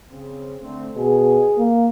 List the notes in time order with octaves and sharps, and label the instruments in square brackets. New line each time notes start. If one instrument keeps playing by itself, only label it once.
[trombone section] C#3 C4
D3 A3 C4
[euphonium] B2 [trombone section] G#4
[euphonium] A#3